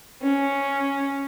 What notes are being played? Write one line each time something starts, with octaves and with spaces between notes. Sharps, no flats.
C#4